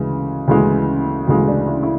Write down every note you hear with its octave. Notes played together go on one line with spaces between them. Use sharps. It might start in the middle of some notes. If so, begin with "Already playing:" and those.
Already playing: D2 C#3 E3 G#3
D2 C#3 E3 G#3
D2 C#3 E3 G#3
D4
E4
E4